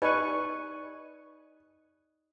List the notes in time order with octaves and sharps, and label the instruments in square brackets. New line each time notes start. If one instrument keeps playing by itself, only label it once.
[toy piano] D#4 G4 D5 [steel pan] B4 G#5 C#6 [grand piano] D#5